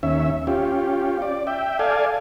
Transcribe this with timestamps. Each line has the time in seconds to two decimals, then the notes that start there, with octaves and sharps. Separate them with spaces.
0.03 D#2 C#4 E5
0.47 C#4 F4 G4
1.22 D5
1.47 E5 G5
1.79 A4 D5 F5 G#5